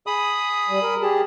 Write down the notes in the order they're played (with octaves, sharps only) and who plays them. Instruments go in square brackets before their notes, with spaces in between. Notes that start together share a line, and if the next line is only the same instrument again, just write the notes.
[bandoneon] G#4 B5 D#6
[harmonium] G3
A#4
[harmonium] G4 G#4 [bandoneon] A5